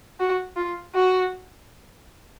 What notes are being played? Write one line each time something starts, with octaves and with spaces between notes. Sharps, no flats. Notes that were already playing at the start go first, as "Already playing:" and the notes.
F#4
F4
F#4